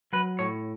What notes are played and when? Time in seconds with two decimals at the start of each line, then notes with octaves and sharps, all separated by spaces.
0.13 F#3 B4
0.39 A2 C#5